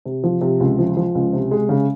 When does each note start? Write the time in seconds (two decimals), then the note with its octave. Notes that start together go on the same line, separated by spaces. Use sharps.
0.05 C3
0.24 F3
0.41 C3
0.60 C#2
0.79 F3
0.97 F3
1.15 C#2
1.33 C3
1.51 G#3
1.69 C#3